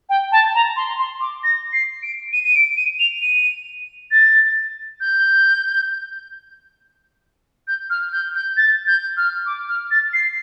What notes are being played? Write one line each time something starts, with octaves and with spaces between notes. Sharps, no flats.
G5
A5
A#5
C6
C6
D6
A#6
C7
D7
D#7
D#7
D7
D#7
F7
D#7
A6
G6
G6
F6
G6
G6
A6
G6
F6
D6
F6
A6
C7